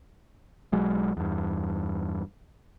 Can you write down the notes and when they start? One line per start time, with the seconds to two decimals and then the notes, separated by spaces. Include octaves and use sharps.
0.72 B1 F#3 G#3
1.17 E2 G2